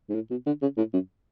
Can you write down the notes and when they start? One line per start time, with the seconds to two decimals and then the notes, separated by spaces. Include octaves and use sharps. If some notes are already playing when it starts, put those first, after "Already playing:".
0.09 G#2
0.14 A2
0.30 B2
0.46 D3
0.62 C#3
0.77 A2
0.93 F#2